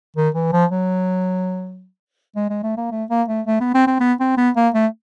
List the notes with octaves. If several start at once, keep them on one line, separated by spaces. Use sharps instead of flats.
D#3
E3
F3
F#3
G#3
G#3
A3
A#3
A3
A#3
A3
A3
B3
C4
C4
B3
C4
B3
A#3
A3